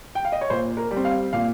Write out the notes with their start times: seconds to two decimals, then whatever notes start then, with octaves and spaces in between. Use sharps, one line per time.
0.15 G5
0.25 F5
0.32 D#5
0.41 C#5
0.50 A#2 C5
0.77 A#4
0.91 G3
0.96 C4
1.05 F5
1.33 A#2 F5